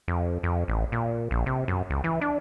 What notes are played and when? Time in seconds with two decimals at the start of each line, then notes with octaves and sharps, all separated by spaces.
0.08 F2
0.43 F2
0.68 A1
0.92 A#2
1.31 A#1
1.46 C3
1.68 F#2
1.90 C#2
2.04 E3
2.21 D4